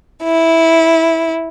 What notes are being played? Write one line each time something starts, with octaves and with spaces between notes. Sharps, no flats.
E4